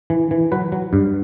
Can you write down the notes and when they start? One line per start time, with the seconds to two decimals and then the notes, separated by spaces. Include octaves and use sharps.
0.10 E3
0.31 E3
0.52 F#3 B4
0.72 F#3
0.93 G2